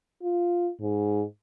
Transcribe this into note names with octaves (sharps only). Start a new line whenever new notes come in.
F4
G#2